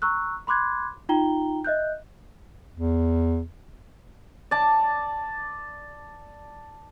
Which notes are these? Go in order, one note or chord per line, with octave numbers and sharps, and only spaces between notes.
A#5 C#6 E6 F#6
B5 C6 D6 F#6 G#6
D#4 F4 G5 A#5 G7
D#5 E5 F#6 G6
E2
D5 A5